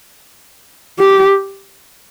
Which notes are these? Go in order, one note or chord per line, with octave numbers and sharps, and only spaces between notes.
G4